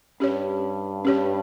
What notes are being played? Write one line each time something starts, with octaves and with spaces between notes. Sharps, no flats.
G2 C#4 G4 C#5
C#4 G4 C#5